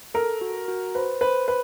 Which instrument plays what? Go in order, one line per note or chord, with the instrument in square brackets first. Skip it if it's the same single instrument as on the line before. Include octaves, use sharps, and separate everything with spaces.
[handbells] A4 [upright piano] A#4
[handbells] F#4
F#4
[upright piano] B4 [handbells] C5
[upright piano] B4 [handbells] C5
[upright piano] B4